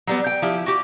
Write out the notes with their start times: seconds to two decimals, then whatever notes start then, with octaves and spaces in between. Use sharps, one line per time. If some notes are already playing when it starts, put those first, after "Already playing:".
0.07 F#3 G3 B3
0.26 G5
0.42 F3 E4 G4
0.66 F#4 G4